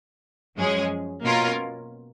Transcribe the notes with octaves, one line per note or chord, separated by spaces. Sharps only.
F#2 F3 G#3 C#4 G#4
B2 A#3 C#4 F4 A#4